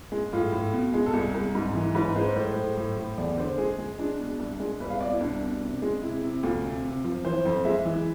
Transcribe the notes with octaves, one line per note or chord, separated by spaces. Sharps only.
G#3
A2 F4
A2
B2
G#3
A4
C2 G#4
C2
G#2
E3
G#2 B4
G#3 C5
A2 C5
A2
A2
A2
E2 D5
D3 C5
G#3 G#4
G#3
G#3 D4
B2
C2
G#3
C2 B4
F5
B2 D5
E4
C2 D4
B2
C3
G#3
C3 E4
C3
D2 F4
C3
C3
F3
E3 C5
F2
G#3 E5
E3